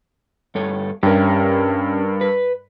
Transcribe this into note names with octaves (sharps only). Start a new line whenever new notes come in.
G2 A4 C#5
G2 C#4 G4 A#4
B4